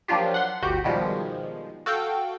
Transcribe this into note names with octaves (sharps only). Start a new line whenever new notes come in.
F3 F#3 A#3 D4 F4 G4
F#5 C6
G1 D2 F#4 G4 G6
B2 D#3 F3 G3 G#3
F#4 A4 F5 G5